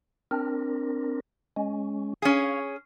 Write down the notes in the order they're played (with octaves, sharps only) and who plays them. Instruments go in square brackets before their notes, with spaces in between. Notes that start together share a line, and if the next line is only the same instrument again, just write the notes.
[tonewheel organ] C4 D4 A#4
G#3 C#4
[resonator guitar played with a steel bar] C#4 G#4 [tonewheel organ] F5